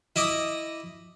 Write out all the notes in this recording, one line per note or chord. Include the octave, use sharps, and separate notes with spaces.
E4 D#5 D6 D#6